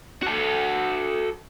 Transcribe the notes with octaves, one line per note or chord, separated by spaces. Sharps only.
F#4 A4